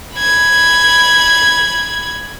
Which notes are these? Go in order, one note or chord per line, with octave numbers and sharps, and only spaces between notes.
B5 G#6